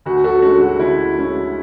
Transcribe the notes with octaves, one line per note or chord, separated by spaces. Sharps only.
D2 F#4
F#4 A4
D3 G#3 C#4 F#4
F#4
D2 E4
D3 G#3 C#4